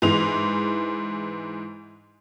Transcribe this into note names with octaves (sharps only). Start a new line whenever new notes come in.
G#2 E3 F7